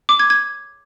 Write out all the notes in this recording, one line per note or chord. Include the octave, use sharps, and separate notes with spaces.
D6
G#6
G#6